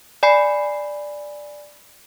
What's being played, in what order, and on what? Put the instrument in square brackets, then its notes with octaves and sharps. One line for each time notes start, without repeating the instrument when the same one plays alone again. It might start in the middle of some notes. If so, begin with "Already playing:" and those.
[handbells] D5 G#5 B5 C7